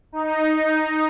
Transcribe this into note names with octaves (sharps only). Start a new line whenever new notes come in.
D#4
D#4